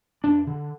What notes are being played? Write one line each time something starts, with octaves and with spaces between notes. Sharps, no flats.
F2 D4
D3